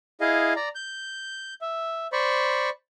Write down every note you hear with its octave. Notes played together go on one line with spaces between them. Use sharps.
E4 G#4 D#5 F5
D5 A#5
G6
E5
C5 D5 B5 C#6